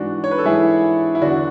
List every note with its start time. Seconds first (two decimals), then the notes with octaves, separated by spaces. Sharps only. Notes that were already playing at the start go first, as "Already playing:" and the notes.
Already playing: G#2 E3 D4 F#4
0.24 C#5
0.31 B4
0.38 A4
0.45 G#2 E3 E4 G#4
1.15 E4
1.22 E2 D3 D4 F#4